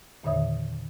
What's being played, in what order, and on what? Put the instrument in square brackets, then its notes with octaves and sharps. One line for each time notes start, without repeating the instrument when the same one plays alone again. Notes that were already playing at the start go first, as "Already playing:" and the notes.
[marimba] E2 A#2 D3 D#3 E5 D#6